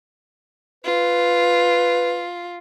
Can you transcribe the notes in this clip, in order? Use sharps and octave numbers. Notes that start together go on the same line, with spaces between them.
F4 B4